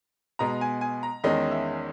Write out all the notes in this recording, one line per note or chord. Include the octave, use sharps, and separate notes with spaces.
B2 G#3 B3 A#5
G#5
G#5
A#5
E2 D#3 G#3 C#4 D#5
E5